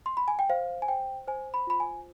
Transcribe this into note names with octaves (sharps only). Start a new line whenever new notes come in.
C6
B5
G#5
G5
C5 F5
G#5
C5 G5
C5 G#5
B5
F4 B5
G#5